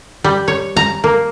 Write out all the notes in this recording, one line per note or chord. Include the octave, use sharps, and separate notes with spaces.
G3
C#5
A#5
A#3